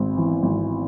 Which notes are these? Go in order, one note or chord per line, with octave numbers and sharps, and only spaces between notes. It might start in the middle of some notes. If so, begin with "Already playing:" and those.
Already playing: G#1 C4
E3
G#1